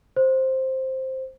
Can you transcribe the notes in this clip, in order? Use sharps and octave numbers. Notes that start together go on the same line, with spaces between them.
C5